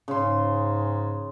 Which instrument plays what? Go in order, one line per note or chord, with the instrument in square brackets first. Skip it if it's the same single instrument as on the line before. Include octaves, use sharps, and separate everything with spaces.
[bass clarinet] G#2 [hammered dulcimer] C#3 C6